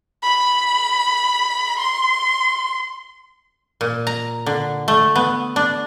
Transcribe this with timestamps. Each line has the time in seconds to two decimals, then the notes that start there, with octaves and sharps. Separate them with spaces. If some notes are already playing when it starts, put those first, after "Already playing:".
0.23 B5
1.79 C6
3.81 A#2
4.07 A#5
4.46 D3
4.88 A3
5.16 B3
5.56 D4